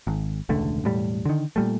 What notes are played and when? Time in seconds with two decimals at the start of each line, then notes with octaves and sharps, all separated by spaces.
0.07 G#1
0.49 E1 C#2 D3 A3
0.84 E1 A2 G3
1.25 D3 D#3
1.56 A#2 G3 A3